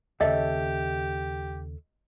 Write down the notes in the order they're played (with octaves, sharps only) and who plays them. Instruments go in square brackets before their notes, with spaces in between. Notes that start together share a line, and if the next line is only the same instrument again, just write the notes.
[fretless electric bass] D#2 C#3 [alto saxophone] G4 [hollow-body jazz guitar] A4 C#5 E5 [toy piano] D#5